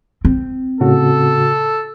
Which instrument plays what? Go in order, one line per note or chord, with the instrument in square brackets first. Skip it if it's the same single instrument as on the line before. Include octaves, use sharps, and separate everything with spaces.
[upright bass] C4
[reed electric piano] A2 C#3 F#4 [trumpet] A4